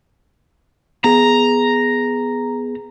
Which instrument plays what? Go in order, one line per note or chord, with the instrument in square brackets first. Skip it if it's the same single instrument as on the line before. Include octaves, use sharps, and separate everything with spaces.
[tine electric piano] B3 G#4 [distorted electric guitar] A#5